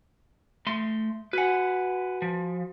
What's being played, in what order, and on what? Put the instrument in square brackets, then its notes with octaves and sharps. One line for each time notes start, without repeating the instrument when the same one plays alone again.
[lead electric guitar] A3 C6
[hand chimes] F#4 G#5 [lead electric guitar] B4 F#5
[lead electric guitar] F3